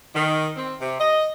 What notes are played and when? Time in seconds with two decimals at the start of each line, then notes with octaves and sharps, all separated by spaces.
0.15 D#3
0.56 C4
0.80 C3
1.00 D#5